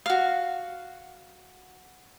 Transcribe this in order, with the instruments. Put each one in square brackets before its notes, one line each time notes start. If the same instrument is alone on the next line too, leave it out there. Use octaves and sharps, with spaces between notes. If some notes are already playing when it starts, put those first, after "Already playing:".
[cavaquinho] F#4 F5